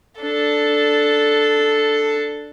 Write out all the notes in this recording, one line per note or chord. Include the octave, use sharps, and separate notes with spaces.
D4 A4